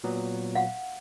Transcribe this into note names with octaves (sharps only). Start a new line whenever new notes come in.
A#2 F#3 B3
F5 F#5